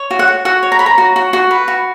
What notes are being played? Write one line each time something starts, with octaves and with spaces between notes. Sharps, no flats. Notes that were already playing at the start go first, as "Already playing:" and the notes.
Already playing: C#5
F#4
F#5
F#4
F#4 F#5
C#5
A#5
C#5 B5
A#5
F#4
F#4
F#4
B4
F#4